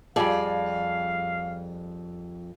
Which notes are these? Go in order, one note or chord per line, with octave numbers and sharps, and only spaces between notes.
F2 F3 G3 G#4 D5 F5